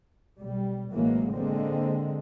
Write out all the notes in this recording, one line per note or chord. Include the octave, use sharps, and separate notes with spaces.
B1 G3
A1 E3 F#3 G#3 A#3
D3 G#3 A#3 C4